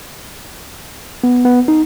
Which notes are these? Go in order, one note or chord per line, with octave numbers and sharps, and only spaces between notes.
B3
B3
D#4